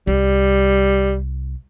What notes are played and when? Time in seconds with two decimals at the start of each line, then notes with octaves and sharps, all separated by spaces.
0.07 C2 G3